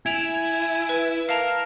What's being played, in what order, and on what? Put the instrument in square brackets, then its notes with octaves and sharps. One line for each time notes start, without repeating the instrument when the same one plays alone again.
[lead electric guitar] E4 [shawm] G#5 [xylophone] G#6 D7 F7
[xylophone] B4
[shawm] A#4 [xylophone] F5 A5 F7